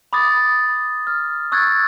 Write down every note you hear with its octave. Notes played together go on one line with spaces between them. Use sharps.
B5 D6 D#6 A6
F6
C#6 E6 F#6 G#6 A6